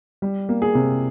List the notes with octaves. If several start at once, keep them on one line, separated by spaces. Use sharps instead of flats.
G3
A#3
G#4
C3